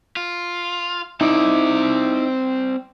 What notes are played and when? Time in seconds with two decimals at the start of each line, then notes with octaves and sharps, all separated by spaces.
0.17 F4
1.21 C4 D#4 E4 D5